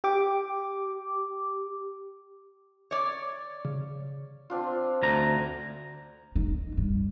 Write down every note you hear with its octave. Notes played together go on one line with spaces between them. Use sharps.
G4 D6
C#5 D5
C#3
C4 D4 F4
D2 A#5
D#4
G2